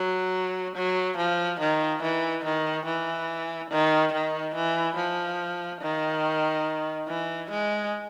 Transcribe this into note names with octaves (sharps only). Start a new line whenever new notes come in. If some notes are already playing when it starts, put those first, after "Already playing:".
Already playing: F#3
F#3
F3
D#3
E3
D#3
E3
D#3
D#3
E3
F3
D#3
E3
G#3